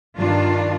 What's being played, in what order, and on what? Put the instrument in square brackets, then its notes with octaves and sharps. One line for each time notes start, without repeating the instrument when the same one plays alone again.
[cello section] G2 D#3 D4 F4